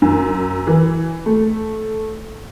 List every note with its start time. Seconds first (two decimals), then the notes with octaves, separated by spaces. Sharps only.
0.02 F#2
0.67 E3
1.26 A3